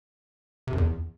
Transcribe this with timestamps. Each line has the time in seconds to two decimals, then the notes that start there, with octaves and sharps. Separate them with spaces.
0.67 C3
0.73 F#2
0.78 E2